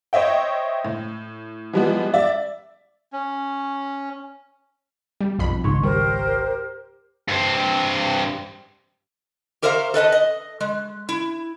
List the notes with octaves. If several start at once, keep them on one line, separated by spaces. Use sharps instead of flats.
C5 C#5 D#5 E5 G5
A2
E3 F3 G3 G#3 B3
D5 E5
C#4
G3
B1 F2 B5
G#1 C#2 G#2 C#5 C6
G3 G4 A#4 C5
G2 C4
G4 A#4 C5 C#5 E5 F5
A4 B4 D#5 A5
D#5
G#3
E4